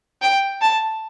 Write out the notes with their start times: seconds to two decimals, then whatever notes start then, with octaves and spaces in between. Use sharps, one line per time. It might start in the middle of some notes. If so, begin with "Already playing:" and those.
0.22 G5
0.61 A5